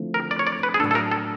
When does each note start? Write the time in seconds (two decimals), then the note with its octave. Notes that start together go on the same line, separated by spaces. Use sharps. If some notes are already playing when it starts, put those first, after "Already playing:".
Already playing: D3 F3 A3 C4 E4
0.14 A#4
0.31 D5
0.39 C#5
0.47 D5
0.63 B4
0.74 G#4
0.79 A2 F#3 A3 D4 A4
0.91 A4
0.95 A#4
1.11 A4